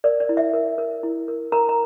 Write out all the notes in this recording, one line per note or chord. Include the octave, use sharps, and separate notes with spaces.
A#4 D5
D5
E4
E5
A#4
A#4
E4
A#4
A#4 A#5
A#5